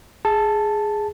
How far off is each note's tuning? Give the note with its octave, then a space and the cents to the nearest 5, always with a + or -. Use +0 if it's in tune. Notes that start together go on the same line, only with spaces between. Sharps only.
G#4 +0 A5 +0